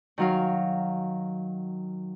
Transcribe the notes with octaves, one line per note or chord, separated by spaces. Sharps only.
D#3 F#3 F5